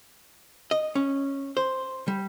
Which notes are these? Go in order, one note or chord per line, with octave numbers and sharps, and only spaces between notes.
D#5
C#4
C5
G3